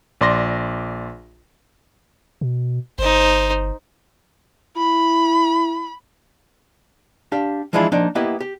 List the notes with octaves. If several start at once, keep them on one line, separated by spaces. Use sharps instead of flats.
A#1 D5 C6 A#6
B2
G1 D#4 C5
E4 B5
D4 G4 F5
E3 F3 G#3 D4 E4 F4
F3 A#3 D4 D#4
A#3 B3 E4 G4 D#5
G4